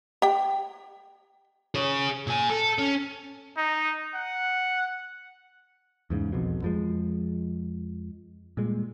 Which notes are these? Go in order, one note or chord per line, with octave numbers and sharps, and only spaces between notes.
G4 G5
G#4 C#5
A#2 G#5
A4
C#4
D#4
F#5
E2 G#2 C#3
E1 B1 F2 B2
F2 F3 G#3
A#2 G3 G#3